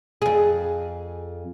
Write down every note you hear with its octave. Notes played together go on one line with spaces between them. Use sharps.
F2 G#4